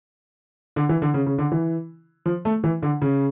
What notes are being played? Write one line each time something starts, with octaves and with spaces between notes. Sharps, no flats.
D3
E3
D3
C#3
C#3
D3
E3
F3
A3
E3
D3
C#3